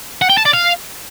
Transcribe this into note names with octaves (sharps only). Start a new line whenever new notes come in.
F#5
G5
A5
D5
F5